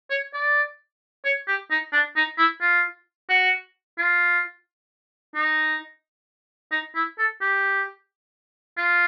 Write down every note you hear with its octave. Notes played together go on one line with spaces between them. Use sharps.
C#5
D5
C#5
G4
D#4
D4
D#4
E4
F4
F#4
F4
D#4
D#4
E4
A4
G4
F4